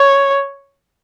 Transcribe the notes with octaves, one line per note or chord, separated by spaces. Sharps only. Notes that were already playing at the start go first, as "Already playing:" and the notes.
Already playing: C#5